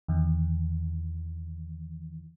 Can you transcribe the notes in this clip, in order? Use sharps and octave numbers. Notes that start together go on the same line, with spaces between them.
E2 D#3 E3